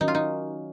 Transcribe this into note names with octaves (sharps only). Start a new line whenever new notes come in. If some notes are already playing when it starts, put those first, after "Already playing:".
D#3 F#3 C#4 D#4 F#4 A#4
F4
D#4